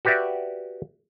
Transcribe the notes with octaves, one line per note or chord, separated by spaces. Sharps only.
F#4 G4 B4 D5 E5